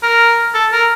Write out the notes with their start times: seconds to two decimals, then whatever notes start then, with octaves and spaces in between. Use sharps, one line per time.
0.03 A#4
0.54 A4
0.72 A#4